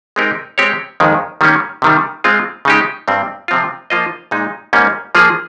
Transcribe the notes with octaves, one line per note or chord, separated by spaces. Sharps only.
G#3 C4 D#4 G4 A#4
G#3 C4 G4 C#5
F2 D#3 G#3
D#3 G3 A#3 C#4
C3 D#3 G3
G#3 C4 F4
C#3 G#3 D#4 G4
G2 G3 C4
C3 F3 C4 F4
F3 A#3 F4 C5 D#5
A#2 G#3 D#4
G#2 G3 A#3 C#4
F3 A#3 F4 G#4